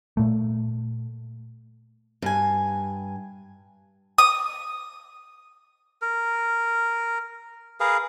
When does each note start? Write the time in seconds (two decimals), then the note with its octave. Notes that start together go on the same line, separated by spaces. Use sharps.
0.17 A#2 A3
2.22 G2 G#5
4.18 D#6
6.02 A#4
7.80 G#4 A#4 B4 F5